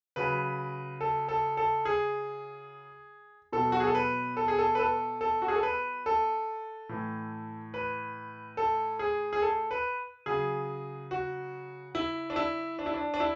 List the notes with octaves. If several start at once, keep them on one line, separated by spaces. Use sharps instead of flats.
C#3 F#3 B4
A4
A4
A4
G#4
B2 F#3 A4
F#4
G#4
A4
B4
A4
G#4
A4
B4
A4
A4
F#4
G#4
A4
B4
A4
A2 E3
B4
A4
G#4
G#4
A4
B4
C#3 F#3 G#4
F#4
E4
D4
E4
D4
E4
D4
D4
E4